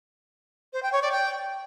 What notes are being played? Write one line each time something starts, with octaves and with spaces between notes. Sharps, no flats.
C5
G5
C#5
D5
G5